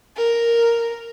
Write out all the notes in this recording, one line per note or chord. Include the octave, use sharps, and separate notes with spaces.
A#4